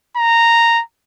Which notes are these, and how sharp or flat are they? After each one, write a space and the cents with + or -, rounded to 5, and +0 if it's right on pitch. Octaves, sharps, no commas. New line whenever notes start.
A#5 -10